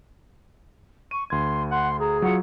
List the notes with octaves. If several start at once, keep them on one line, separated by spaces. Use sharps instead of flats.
C#6 D#7
D2 C6 G#6
F#5 C6
G#4 A#5
F#3 F4 F#5